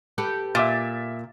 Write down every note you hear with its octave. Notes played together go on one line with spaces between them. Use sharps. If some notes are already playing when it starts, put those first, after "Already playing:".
G4 A4 B4
A#2 E5 D6 A6